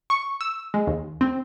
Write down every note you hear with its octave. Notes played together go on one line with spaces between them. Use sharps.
C#6
E6
G#3
D#2
C4